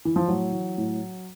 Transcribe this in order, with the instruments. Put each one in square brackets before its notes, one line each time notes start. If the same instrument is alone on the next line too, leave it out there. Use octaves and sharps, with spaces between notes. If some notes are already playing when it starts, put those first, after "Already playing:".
[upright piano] E3
F3
A2 F#3
E3
A2